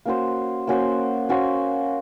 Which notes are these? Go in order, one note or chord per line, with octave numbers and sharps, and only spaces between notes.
A#3 C#4 F#4 C5
A#3 C#4 F#4 C5
A#3 C#4 F#4 C5